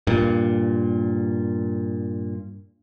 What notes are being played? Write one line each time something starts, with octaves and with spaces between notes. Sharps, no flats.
G2 A#2